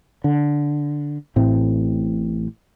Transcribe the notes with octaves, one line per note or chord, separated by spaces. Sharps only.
D3
A1 A2 C4